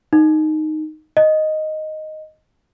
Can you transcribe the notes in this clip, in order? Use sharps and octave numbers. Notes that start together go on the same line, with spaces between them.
D#4
D#5